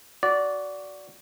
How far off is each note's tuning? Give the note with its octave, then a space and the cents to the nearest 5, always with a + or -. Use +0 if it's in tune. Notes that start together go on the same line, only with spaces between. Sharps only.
F#4 +0 D5 -15